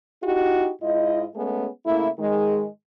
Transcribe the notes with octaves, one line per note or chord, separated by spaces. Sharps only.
D#4 E4 F#4 G4
G#2 E4 F4 D#5
G#3 A3 B3 C#4 G#4
C#3 A3 A#3 E4
G#2 D#3 G#3